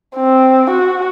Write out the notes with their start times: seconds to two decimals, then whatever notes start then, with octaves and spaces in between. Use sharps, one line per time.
0.16 C4
0.70 F#4